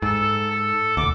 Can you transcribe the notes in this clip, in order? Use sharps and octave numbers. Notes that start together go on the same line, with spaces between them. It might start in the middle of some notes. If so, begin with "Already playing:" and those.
G#2 A4
A4
E1 D2 D6